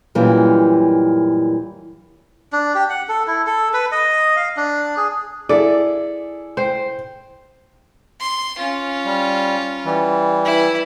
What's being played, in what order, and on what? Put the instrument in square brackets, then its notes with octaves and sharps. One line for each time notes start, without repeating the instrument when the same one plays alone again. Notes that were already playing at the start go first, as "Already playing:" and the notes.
[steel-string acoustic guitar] F#2 A#2 E3 G3 D#4
[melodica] D4
G4
F#5
A4
E4
A4
B4
D#5
F5
D4
G#4
[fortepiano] E4 G#4 A4 [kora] D5
[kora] C5 G5
[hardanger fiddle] C6
C#4 F4
[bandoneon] G3
E3 G3
[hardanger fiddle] E4 B4